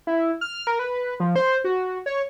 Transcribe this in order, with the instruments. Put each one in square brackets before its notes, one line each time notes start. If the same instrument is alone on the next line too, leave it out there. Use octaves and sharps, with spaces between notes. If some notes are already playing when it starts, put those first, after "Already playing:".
[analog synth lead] E4
F6
A#4
B4
F3
C5
F#4
C#5